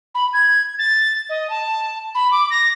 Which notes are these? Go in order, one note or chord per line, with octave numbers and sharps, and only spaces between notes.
B5
G#6
A6
D#5
A5
B5
D6
A#6